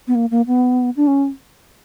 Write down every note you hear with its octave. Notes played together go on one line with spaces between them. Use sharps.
B3
A#3
A#3
B3
D4
C#4